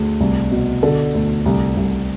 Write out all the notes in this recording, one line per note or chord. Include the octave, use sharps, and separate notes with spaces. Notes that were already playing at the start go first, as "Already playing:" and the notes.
Already playing: D2 G#4
C2
B2
D3 A4
D2
C2
C2